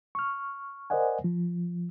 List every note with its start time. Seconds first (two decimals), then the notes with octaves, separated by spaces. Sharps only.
0.15 C#6 F6
0.90 A#4 C5 D5 D#5 F#5 G#5
1.24 F3